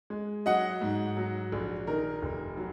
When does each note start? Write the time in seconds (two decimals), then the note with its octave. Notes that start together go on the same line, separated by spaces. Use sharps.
0.10 G#3
0.46 F#3 D#5 F#5
0.81 G#2
1.17 F#3
1.52 A#1
1.87 D#3 A#4
2.22 F1
2.57 F#3